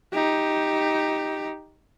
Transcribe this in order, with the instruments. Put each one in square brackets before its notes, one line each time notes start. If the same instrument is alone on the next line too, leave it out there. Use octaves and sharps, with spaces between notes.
[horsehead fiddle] D#4 G4